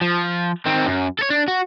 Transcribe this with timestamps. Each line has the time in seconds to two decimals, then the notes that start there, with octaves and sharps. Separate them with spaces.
0.01 F3
0.66 D#3 C4
0.86 F#2
1.19 A4 C#5
1.30 D4
1.48 F#4